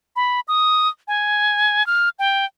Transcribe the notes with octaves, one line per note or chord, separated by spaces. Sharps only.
B5
D#6
G#5
F6
G5